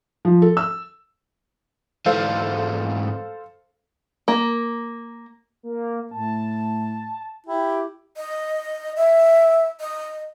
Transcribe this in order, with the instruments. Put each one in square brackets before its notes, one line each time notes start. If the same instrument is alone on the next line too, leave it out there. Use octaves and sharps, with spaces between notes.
[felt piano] F3
A4
E6
[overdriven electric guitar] G#2 E3 [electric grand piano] A4 C5 F5
[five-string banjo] A#3
[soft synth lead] A#3
[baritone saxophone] A2 [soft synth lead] A5
[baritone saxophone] E4 [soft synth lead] G4
[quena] D#5
E5
D#5